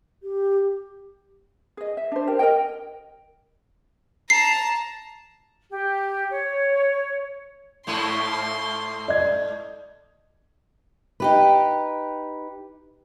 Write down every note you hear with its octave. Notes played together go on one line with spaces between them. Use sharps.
G4
G#4 D#5
E5
D4 C5
G4 A#4
A#4 D5 D#5 G5
A5 A#5 C7
G4
C#5
G#2 A3 E4 C6
D5 D#5 G#6
D#4 G4 B4